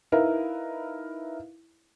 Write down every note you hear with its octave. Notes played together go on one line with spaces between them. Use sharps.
D#4 E4 A#4 B4 F5